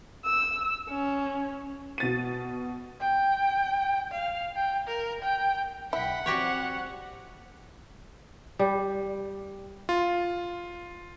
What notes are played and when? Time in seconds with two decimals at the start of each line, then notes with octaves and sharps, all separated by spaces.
0.25 E6
0.89 C#4
1.98 B2 A6 D#7
3.00 G5
4.12 F5
4.56 G5
4.88 A#4
5.22 G5
5.93 B1 E4 F#5 G5 B6
6.26 F3 G3 C4 F#4 G4 C#5
8.59 G3
9.89 F4